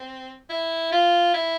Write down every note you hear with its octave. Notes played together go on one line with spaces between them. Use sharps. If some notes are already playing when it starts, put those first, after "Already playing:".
Already playing: C4
E4
F4
E4